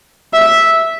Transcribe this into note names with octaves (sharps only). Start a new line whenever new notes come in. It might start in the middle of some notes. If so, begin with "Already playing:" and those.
E5